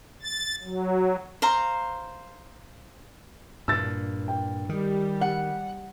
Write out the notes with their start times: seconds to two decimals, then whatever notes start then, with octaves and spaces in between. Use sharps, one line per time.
0.22 A6
0.63 F#3
1.42 C5 F5 A#5
3.68 G2 A#2 E6 A6
4.28 G5
4.69 D#3 G3
5.21 F#5